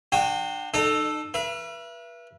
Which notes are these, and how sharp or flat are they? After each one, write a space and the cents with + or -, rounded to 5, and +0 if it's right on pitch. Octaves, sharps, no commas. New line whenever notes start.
D4 +35 F#4 -20 G5 +5
D#4 -30 A4 +0 D5 +45
B4 -35 E5 +35